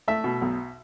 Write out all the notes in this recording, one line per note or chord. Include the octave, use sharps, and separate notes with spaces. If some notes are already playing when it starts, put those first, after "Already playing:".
A3 E5
B2
B1